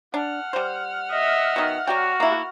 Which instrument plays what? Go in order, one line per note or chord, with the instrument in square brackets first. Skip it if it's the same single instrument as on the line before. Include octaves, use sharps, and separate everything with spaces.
[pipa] D4 [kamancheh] F#5 F6
[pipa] G3 C5
[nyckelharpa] D#5 E5
[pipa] B2 D#3
[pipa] F#3 D5 G5 [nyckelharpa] F#4
[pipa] A#3 E4